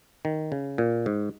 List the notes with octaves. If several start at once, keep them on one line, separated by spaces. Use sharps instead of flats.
D#3
C#3
A#2
G#2